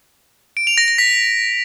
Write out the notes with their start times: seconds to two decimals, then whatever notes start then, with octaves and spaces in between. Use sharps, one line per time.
0.57 D7
0.67 F7
0.78 A#6
0.88 A#6
0.98 B6